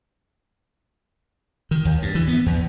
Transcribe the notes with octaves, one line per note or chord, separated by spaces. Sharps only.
D#3
D#2
G2
E3
B3
E2